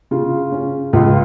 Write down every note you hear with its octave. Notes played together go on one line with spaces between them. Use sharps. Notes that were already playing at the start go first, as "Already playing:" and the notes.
C#3 F4
C#4
C#2 F4